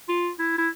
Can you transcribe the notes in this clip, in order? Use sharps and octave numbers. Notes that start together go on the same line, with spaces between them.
F4
E4
E4